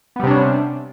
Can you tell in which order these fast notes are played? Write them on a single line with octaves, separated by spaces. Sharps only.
B3 G3 C3 D4 C#4